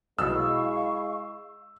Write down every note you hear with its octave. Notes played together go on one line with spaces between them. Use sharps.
B1 B2 G#3 E4 F5 C#6 E6